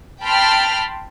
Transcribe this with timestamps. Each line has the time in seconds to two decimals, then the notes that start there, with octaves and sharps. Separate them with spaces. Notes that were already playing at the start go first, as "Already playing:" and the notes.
0.22 G5 A5 B5 C6 F6